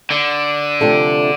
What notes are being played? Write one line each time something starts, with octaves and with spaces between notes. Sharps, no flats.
D3
C3 F3 A3 D4 A4